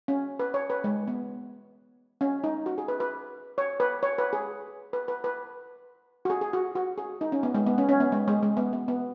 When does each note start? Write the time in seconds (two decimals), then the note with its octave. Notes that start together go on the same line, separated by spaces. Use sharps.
0.08 C#4
0.40 B4
0.54 C#5
0.70 B4
0.84 G#3
1.08 B3
2.21 C#4
2.44 D#4
2.66 F#4
2.78 G#4
2.88 B4
3.00 B4
3.58 C#5
3.80 B4
4.03 C#5
4.18 B4
4.33 G#4
4.93 B4
5.08 B4
5.24 B4
6.25 F#4
6.30 G#4
6.41 G#4
6.53 F#4
6.75 F#4
6.98 G#4
7.21 D#4
7.32 C#4
7.43 B3
7.54 G#3
7.66 B3
7.78 C#4
7.89 C#4
8.00 B3
8.12 G#3
8.28 G#3
8.43 G#3
8.57 B3
8.73 B3
8.88 B3